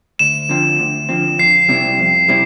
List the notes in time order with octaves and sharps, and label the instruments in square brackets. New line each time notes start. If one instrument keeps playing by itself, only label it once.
[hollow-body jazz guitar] D2 [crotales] E7
[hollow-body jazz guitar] D3 F3 C4
D2
D3 F3 C4
[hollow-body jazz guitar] F2 [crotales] C7
[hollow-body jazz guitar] C3 G3 C4 E4
F2
C3 G3 C4 E4